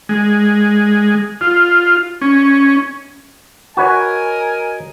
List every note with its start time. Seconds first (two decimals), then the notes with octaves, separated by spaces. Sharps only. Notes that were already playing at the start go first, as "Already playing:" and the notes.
0.09 G#3
1.41 F4
2.21 C#4
3.77 F#4 A#4 B4 C#5 D#5 G#5